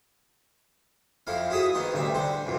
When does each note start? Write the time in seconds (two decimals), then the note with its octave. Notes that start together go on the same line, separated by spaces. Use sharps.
1.27 F2 F3 E4 F5
1.50 E4 F#4 G#4 E5 D#6
1.75 D#3 B3 C5
1.93 A1 D2 C3 G3 E5
2.14 D3 G3 C5
2.46 C2 F2 B2